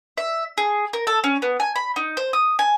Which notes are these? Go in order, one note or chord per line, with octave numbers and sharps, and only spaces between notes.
E5
G#4
A#4
A4
C#4
B3
G#5
B5
D#4
C5
D#6
G#5